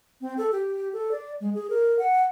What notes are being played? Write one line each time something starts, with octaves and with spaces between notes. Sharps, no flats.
C4
A4
G4
A4
D5
G#3
G#4
A#4
F#5